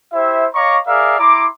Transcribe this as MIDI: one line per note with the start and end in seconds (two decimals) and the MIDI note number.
0.13 0.46 64
0.13 0.46 67
0.13 0.46 72
0.13 0.46 76
0.55 0.78 73
0.55 0.78 75
0.55 0.78 77
0.55 0.78 82
0.55 0.78 85
0.55 0.78 86
0.87 1.18 68
0.87 1.18 70
0.87 1.18 74
0.87 1.18 76
0.87 1.18 77
1.19 1.47 64
1.19 1.47 82
1.19 1.47 84
1.19 1.47 86